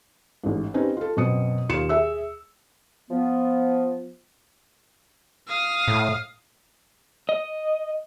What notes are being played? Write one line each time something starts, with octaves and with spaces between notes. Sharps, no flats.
A1 G#2
C4 C#4 D#4 G4 B4
F4 A4
F#2 B2 C4 D#6 C#7
D#2 F4 C#7 E7
G#4 E5 E6
F3 B3
F5 D#6
A2
D#5